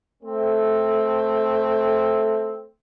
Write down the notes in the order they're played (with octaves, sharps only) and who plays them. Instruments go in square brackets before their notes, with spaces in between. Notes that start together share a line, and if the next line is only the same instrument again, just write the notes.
[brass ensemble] A3 C4